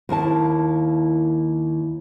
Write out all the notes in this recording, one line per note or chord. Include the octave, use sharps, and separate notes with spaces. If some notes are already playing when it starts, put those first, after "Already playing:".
D#2 A#3 E4 A5